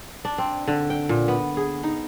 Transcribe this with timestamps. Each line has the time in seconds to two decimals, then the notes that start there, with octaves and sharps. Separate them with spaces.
0.25 D4
0.38 C4
0.68 D3
0.90 G5
1.09 A#2
1.28 B3
1.57 G#4
1.83 D#4